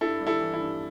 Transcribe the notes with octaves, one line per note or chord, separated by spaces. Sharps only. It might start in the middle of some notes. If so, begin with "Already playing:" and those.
G2 E4 A4
G3
E4 A4
E3
E4
G2